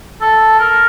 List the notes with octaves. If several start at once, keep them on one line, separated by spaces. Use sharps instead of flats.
A4
A#4